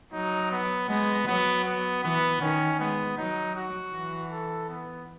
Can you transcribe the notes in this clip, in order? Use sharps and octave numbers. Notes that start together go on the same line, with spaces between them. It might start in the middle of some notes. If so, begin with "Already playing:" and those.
F#3 D#4
B3
G#3 B3
F#3 B3
B3
E3 B3
D#3 C#4
G#3 B3
F#3 D#4
F#4
E3
A4
B3